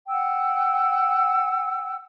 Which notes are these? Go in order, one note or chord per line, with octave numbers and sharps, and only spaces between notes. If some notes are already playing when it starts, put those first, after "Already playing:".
F#5 G5 E6